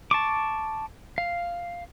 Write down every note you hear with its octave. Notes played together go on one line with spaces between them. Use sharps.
A5 C#6 D6
F5